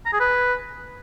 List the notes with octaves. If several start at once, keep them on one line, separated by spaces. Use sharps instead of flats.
A#5
G#4
B4